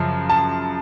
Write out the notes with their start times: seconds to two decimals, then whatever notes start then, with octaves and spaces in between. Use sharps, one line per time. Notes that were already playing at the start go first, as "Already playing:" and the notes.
Already playing: F#2 C#3 F3
0.30 A5